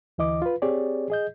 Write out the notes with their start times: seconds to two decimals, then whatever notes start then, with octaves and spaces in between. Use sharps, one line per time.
0.18 D2 E3 D#5 D6
0.42 F4 B4
0.62 C4 G4 G#4 C#5 D5
1.10 G#4 D#5 G6